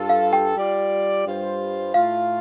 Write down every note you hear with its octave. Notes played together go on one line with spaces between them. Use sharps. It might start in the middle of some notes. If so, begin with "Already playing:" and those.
Already playing: G2 G3 F4 A4
F5
G5
G3 F4 D5
G2 G3 F4 C5
A2 A3 F4 F5